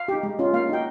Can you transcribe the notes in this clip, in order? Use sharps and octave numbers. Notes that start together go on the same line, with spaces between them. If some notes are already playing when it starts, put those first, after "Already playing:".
Already playing: F5
D#4 G4
G#3
C#4 F4
A#3 F5
D#4 F#4 G5